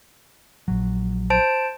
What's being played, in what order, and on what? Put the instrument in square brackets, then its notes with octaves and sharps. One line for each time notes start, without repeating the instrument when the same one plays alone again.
[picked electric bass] A#1 F#3
[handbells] C5 A5 D7